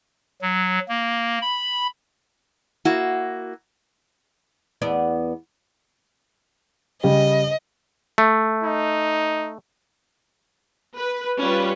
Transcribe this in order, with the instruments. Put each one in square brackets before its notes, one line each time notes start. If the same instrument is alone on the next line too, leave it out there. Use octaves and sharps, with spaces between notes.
[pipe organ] F#3
A#3
B5
[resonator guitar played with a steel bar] A#3 E4 F#4
[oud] E2 B3 D5
[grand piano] C#3 G3 G4 [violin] D#5
[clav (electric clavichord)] A3
[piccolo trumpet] D#4
[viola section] B4
G3 C#4 F4 B4